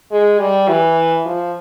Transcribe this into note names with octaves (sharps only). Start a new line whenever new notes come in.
G#3
G3
E3
F3